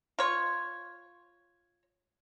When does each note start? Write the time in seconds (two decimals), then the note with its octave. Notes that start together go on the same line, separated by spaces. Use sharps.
0.19 F4 C#5